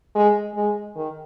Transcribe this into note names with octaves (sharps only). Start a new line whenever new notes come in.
G#3
G#3
D#3